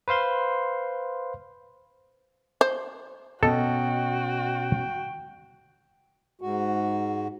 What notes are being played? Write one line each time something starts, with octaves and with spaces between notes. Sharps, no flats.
B4 C5 F5 C6
C5
B2 C#4 F#4 A4 D#5 G5
G#2 F#4